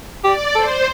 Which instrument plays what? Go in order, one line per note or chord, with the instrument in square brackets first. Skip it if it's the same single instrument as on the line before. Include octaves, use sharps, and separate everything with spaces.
[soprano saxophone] G4 [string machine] D5
[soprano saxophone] A4 [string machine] C5